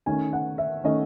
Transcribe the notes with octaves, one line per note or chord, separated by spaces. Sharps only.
D#3 A3 C#4 G#5
F#5
E5
D#3 A3 C#4 D#5